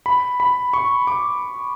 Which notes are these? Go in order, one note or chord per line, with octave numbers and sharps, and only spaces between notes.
B5
B5
C#6
D6